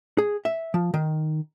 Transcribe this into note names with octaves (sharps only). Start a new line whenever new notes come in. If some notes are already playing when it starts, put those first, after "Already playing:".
G#4
E5
F3
D#3